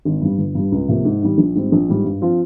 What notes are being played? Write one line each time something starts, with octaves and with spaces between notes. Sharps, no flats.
G#1
G2 G3
G1
G2 G3
C#2
C3 F3 A#3
G#2
D#3 G3
A#1
G#2 G3 C4
A#1
G#2 G3
G2
F3 C4 F4